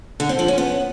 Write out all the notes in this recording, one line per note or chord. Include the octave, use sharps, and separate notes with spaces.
D3
C4
F3
C#4
B3